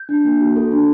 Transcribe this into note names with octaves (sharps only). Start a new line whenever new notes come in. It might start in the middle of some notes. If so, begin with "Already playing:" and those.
Already playing: G6
D4
A#3
F#4
A4
D4